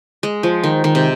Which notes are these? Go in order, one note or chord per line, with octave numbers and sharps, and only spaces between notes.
G#3
F3
D#3
D#3
C3